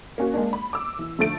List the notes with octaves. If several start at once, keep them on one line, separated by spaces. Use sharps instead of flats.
A#3 C#4 F#4
G#3 A#3 D4
B5
D6 E6
E3
D3 F3 A3 A6 D7